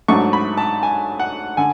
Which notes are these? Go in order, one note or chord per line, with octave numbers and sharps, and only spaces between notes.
G#2 F#3 A3 D4 C#6
B5
A5
G#5
F#5
D3 G#5